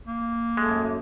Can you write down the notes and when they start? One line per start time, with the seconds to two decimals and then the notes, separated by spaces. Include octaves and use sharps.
0.06 A#3
0.57 F#2 G#3 A3